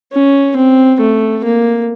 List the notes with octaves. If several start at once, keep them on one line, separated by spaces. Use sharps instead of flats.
C#4
C4
A3
A#3